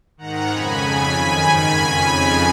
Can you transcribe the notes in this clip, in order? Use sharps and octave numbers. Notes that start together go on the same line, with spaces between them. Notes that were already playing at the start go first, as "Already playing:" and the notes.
G#2 D#3 F#5 A#5
F2 C#3 G#5 B5
F2 C#3 G#5 B5
F#2 D#3 G#5 B5
G#2 D#3
F2 C#3